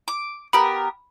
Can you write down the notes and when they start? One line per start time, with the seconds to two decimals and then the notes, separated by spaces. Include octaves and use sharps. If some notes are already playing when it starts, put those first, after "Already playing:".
0.08 D6
0.53 B3 G4 A#4 B5